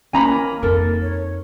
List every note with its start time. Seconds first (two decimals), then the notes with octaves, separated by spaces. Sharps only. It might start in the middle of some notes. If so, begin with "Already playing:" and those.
0.13 E3 A#3 C#4 G#5 A#5 B5
0.63 F2 D#4 A4 A#4
1.02 C#5